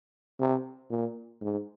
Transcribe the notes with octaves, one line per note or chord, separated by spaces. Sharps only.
C3
A#2
G#2